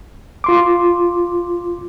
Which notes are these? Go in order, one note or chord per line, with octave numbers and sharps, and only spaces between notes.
F4 C6 D6